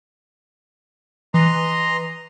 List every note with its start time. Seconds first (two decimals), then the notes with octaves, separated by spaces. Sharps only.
1.34 E3 D#5 A#5 C6